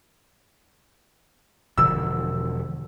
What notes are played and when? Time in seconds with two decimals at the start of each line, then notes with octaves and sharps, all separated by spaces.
1.78 E1 D3 F3 E6